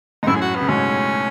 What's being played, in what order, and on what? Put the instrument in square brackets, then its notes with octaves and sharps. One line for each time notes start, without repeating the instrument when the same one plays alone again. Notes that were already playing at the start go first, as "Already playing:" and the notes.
[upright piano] G#2 [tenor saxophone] D#4
[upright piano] F#2 A2 [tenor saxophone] E4
[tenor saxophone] G#4
F#4
B3
[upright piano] C#3
[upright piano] G#2 B2 [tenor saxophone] C#4